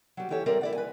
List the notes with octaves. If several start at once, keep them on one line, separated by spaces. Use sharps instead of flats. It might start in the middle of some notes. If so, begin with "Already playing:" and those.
F#3 G3
E3 G4 A4 C#5
E3 G3 C4 A#4 D5 E5
E4 D5 F#5
B4 G#5